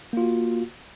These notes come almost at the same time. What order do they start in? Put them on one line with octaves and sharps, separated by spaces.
A#3 F4 F#4